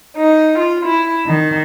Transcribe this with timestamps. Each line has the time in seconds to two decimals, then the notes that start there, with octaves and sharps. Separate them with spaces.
0.17 D#4
0.58 F4
0.86 E4
1.27 D#3